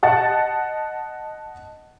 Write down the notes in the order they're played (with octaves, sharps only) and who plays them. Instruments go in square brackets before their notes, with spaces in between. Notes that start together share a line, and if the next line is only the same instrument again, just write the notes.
[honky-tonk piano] D#5 F#5 A5 A6 C#7